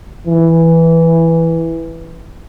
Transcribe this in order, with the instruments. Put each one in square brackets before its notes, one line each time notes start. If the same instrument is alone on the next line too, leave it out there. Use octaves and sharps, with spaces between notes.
[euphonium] E3